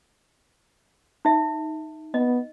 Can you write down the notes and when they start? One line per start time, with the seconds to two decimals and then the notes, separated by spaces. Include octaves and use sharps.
1.25 D#4 E5
2.14 B3 D#5